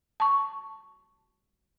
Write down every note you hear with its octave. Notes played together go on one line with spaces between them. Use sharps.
A5 C#6